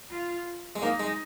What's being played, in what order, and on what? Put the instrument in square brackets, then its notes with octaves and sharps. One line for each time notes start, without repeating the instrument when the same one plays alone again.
[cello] F4
[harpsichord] G#3
[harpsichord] A#3 [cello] D#4
[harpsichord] G#3